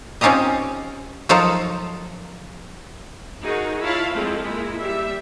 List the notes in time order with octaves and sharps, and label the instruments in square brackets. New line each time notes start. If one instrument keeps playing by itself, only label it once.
[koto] C4 C#4 D#4 F4 G4 D#5
F3 F#3 D#4 F4 A4 A#4
[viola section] D#4 F#4 G#4 A#4
E4 F4 C#5 F5 A5 B5
F3 G#3 A3 C4 E4 A4
G#3 A#3 E4 F4
G3 E5